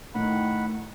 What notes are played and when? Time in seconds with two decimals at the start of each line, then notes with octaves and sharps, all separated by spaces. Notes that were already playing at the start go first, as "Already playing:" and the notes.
0.15 A2 D#3 F#5 B5